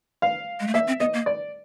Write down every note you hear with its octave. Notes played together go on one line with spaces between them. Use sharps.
F5
G#3
A3
A#3 E5
C4
B3 D#5
A#3
D5